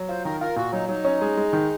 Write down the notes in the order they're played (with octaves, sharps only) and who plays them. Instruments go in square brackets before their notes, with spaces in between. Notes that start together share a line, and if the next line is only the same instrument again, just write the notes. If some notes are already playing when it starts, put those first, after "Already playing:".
Already playing: [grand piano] F#3
[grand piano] F4 [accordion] C5
[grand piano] D#3 [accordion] A#4
[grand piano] F4 [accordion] A#4
[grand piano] A#2 [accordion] F#4
[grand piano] F#3 [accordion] D#4
[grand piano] F#3 [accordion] D#4
[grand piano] C#4
G#3
G#3
D#3